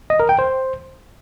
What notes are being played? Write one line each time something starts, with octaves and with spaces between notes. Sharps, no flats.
D#5
A#4
G5
C5